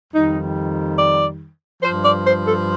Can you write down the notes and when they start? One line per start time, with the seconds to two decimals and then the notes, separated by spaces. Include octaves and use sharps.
0.13 F2 D#3 G3 D#4
0.98 D5
1.82 G2 F3 C5
2.03 D5
2.25 C5
2.46 A4